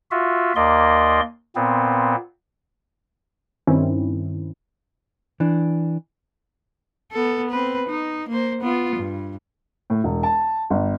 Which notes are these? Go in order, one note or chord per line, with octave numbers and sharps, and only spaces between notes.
F4 F#4 E5
D#2 A#3 D5 D#5 C6
A#2 B3 C4
G2 D#3 C4 C#4 E4
E3 D4
B3 A4
C4 B4
D#4
A#3 C5
B3 F4
G2
A2
E1
A5
G1